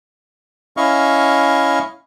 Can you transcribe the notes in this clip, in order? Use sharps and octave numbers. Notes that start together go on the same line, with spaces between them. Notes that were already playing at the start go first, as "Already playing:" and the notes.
C#4 E4 D#5 F5 C#6